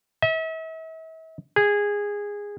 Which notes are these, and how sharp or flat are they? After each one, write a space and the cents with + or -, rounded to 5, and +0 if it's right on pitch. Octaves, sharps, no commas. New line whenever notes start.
E5 -40
G#4 -15